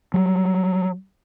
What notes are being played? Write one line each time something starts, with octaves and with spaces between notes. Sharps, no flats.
F#3 G3